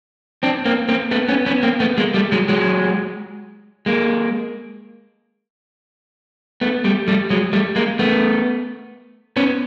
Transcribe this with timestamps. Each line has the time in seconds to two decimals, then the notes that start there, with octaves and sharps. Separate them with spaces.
0.43 C4 D4
0.65 A#3 C4
0.89 A#3 C4
1.11 A3 B3
1.29 B3 C#4
1.46 B3 C#4
1.63 A#3 C4
1.80 A3 B3
1.98 G#3 A#3
2.14 G3 A3
2.32 F#3 G#3
2.49 F#3 G#3
3.86 G#3 A#3
6.61 A3 B3
6.84 G3 A3
7.08 G3 A3
7.30 F#3 G#3
7.53 G3 A3
7.76 G#3 A#3
7.99 A3 B3
9.36 B3 C#4